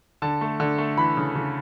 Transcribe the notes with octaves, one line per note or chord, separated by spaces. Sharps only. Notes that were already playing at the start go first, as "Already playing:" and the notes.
D3 A5
A3
D3
A3
E3 B5
C#3
C#3